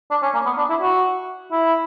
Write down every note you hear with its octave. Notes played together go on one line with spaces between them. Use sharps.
D4
C#4
A#3
B3
D4
E4
F#4
E4